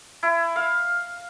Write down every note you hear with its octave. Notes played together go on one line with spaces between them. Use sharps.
E4
F5